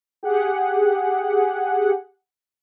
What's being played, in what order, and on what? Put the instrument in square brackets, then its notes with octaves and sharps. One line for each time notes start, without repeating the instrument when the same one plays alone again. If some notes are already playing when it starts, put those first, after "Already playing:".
[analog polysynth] G4 G#4 F#5